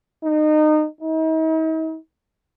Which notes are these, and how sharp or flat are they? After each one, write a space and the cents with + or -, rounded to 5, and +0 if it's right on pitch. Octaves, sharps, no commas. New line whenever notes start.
D#4 -25
D#4 +45